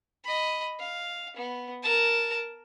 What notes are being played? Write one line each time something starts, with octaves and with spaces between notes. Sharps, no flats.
D#5 B5
F5
B3
A#4 A5